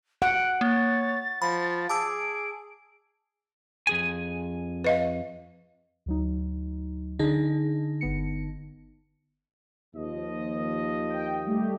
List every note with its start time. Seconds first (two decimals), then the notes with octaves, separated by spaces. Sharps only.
0.22 F#5 D7
0.61 A#3 C#5 A6
1.42 F3 B5
1.89 G#4 A5 D6 E6 D7
3.87 F2 G#4 G#5
4.84 B4 D#5 F5
6.06 D2 F#3 D#4
7.19 D3 D4 D#4 G#4
8.01 G1 B3 C#7
9.95 D#2 F3 D#5
11.10 G5
11.46 G3 A3 G4